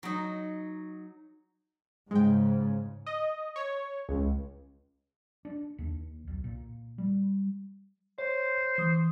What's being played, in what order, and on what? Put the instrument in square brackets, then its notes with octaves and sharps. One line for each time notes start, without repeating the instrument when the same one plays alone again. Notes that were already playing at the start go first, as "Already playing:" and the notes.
[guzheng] F#3 D#4
[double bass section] G#2 C#3 [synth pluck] G#3 G5
[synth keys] D#5
C#5
C#2
[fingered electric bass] D4
D#2
B1
A#2
G3
[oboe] C5 [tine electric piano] C#5
[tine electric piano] E3 D#6